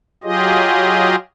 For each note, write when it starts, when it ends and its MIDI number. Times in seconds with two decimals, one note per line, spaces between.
0.24 1.16 54
0.24 1.16 65
0.24 1.16 67
0.24 1.16 68
0.24 1.16 75